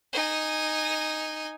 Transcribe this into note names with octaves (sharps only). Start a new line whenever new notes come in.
D#4 G#5